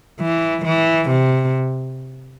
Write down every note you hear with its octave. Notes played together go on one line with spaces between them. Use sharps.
E3
E3
C3